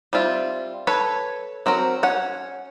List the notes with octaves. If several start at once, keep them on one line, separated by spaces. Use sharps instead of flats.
G3 C4 F4 E5
A4 B4 C#5
F#3 C4 F#4 A#4
C#4 C#5 F#5